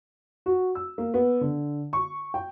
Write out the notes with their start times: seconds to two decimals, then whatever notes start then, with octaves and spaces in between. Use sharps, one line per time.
0.46 F#4
0.75 E6
0.98 A#3
1.14 B3
1.41 D3
1.93 C#6
2.34 G5